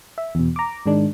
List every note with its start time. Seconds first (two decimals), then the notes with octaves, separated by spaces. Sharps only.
0.18 E5
0.35 E2 B2
0.56 A#5 D6
0.86 G#2 D#3 G#3 D4